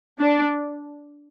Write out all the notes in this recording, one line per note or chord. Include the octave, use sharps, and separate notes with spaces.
D4